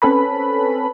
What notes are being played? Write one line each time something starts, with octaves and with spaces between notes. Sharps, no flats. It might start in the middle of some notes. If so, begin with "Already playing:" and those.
C4 C#4 A4 B4 B5